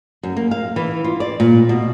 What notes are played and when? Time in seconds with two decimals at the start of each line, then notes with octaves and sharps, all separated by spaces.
0.23 F#2
0.37 A#3
0.51 F5
0.76 E3
1.04 F4
1.20 D5
1.40 A#2
1.69 B2